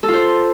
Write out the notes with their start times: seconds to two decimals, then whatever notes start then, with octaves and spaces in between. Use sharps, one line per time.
0.03 A4
0.08 F4
0.13 C5